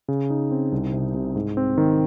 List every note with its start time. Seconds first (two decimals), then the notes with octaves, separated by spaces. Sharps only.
0.08 C#3
0.30 D#4
0.51 C4
0.72 C2
0.93 C3
1.14 C3
1.36 G#2
1.57 C4
1.78 D#3